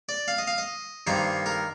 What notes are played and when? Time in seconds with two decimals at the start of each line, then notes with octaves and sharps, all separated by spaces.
0.09 D5
0.28 F5
0.38 D#5
0.47 F5
0.58 D#5
1.07 G2 D#3 A#3 C5
1.46 A#4